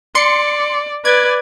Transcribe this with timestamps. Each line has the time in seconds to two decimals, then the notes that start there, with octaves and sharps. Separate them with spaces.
0.15 D5 C6 C#7
1.05 B4 D5 G#6